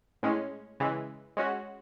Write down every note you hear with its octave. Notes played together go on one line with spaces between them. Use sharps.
A2 G#3 C#4
C#3 E3 G#3
G#3 C#4 F#4